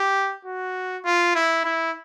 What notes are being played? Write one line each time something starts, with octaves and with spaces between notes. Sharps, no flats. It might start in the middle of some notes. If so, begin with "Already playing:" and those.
Already playing: G4
F#4
F4
E4
E4